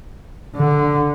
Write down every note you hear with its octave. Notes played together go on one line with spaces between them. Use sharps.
D3